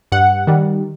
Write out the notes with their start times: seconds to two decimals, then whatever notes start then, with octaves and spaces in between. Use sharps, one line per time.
0.12 G2 F#5
0.47 D#3 G3